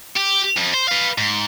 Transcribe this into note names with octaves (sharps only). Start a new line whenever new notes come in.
G4
F2
C5
B4 F5
G#2